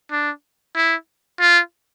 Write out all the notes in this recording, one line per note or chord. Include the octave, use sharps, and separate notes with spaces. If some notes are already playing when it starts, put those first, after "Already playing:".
D4
E4
F4